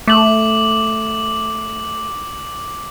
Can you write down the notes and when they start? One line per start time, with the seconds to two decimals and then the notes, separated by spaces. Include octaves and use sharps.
0.07 A3 D6 F#7